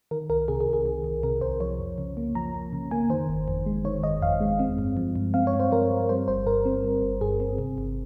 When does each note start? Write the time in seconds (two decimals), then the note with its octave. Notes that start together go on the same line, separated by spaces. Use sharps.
0.11 D#3 A#4
0.30 C2 A#4
0.48 C3 G#4
0.61 G#4
0.67 C2
0.73 G#4
0.86 D#3
1.04 C2
1.23 C3 A#4
1.41 C2 C5
1.60 F3 C#5
1.80 F2
1.98 C#3
2.17 A#3
2.35 F3 A#5
2.54 F2
2.72 C#3
2.91 A#3 G#5
3.10 D#3 C5
3.29 G1
3.48 F2
3.66 G#3
3.84 D#3 C#5
4.03 G1 D#5
4.22 F2 F5
4.41 G#3
4.59 C4
4.78 G2
4.97 F3
5.16 G2
5.34 C4 F5
5.47 C#5
5.53 G2
5.60 C5
5.71 F3 A#4
5.90 G2
6.09 G3 C5
6.28 G1 C5
6.46 G2 A#4
6.65 C4
6.85 G3
7.02 G1
7.21 G2 G#4
7.40 C4
7.58 C3
7.78 G1